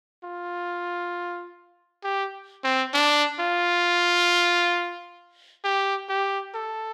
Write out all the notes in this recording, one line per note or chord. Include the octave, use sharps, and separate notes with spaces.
F4
G4
C4
D4
F4
G4
G4
A4